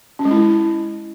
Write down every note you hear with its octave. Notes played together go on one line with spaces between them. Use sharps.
C#4
G#3
E4